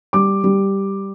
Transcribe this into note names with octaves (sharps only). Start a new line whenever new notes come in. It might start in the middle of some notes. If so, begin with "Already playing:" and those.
G3 D6
G3